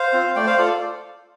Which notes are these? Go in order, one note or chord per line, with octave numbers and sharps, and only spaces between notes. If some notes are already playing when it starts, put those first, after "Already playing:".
Already playing: C5 F5
C4 F4
A3 D5 G5
C5 F5
F4 A4 D5